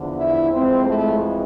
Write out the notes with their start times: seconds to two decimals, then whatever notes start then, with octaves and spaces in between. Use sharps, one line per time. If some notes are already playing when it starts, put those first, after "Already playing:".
Already playing: E2 D3 F3
0.17 E4
0.51 F2 E3 G#3 C4
0.85 A3